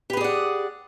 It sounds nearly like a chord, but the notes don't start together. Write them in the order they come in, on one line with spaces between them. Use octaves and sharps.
G4 B4 G#4 D5 F#5